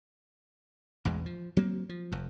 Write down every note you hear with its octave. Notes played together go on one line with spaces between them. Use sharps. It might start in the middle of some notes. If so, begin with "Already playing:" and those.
A1 E2 B2 G#3
F3
F#3 A#3 C4
F3
F1 F2